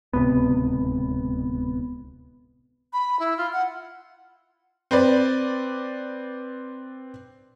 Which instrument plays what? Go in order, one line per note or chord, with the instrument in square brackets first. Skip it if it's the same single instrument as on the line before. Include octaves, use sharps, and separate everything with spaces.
[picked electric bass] D1 C#2 C3 [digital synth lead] B3
[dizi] B5
E4
F4
F#5
[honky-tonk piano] C4 B4 D5